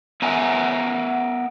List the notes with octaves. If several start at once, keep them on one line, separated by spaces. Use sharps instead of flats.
B3 A4 A#4 E5 G#5